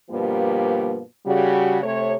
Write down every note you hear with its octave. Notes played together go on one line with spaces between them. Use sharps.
G2 B2 F3 G3 A#3
C#3 G3 F#4
C3 A3 C#5